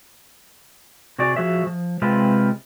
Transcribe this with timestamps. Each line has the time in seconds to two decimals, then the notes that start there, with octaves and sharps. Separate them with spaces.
1.18 C3 F#4 G#4 D5
1.36 F3 F#4 G#4 E5
1.67 F3
2.02 C3 G#3 C4 F4 B4